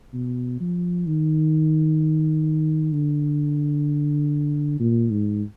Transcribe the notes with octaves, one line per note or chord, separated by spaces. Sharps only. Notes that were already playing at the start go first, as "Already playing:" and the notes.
B2
F3
D#3
D3
A#2
G#2